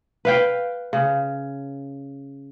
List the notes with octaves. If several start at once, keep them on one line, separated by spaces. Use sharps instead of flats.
B4 F5 G5
C#3